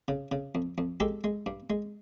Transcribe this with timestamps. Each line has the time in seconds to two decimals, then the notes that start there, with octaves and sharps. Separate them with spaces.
0.08 C#3
0.32 C#3
0.55 F2
0.78 F2
1.00 G#3 G4 A4
1.24 G#3
1.46 G2
1.70 G#3